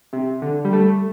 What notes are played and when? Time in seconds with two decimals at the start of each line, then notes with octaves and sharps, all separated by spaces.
0.13 C3
0.42 D3
0.65 G3
0.73 A3